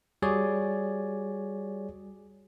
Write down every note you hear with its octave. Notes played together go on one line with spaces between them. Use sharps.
G3 F#4 G#4 C#5 D5